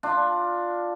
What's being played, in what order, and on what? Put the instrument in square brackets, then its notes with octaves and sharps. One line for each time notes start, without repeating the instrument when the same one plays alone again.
[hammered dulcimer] D4 F4